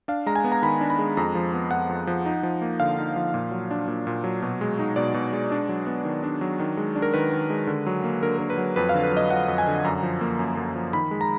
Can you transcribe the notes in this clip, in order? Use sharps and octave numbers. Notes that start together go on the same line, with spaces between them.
D4 F5
G#3 A#5
G#5
B3
A#5
D#3 B5
D4
B5
G#3
F2 A#5
F3
B3
F2 F#5
F2
F3
D#4
F3
A#3
D3 F5
D#4
F3
A#2
F#3
D4
A#2
A#2
F#3
B2
G#3
D#4
B2 D5
B2
G#3
D4
F#3
B3
D#3
D4
F#3
D#3
G#3
D4
A#4
D#3 B4
D#3
G#3
D3
F#3
A#3
D3 A#4
D3 A#4
B4
F#3
F2 B4
D3 F5
B4
F#3 D#5
F2 F#5
F2
G#5
D3
F#2 A#5
F3
A#3
F#2
F#2
F3
D#3 B5
G#3
A#5